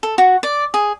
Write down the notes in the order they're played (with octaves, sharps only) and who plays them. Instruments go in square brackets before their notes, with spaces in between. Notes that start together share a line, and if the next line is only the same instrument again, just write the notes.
[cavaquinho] A4
F#4
D5
G#4